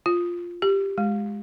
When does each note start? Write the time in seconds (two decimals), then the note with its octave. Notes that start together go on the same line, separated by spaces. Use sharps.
0.06 F4
0.62 G4
0.98 G#3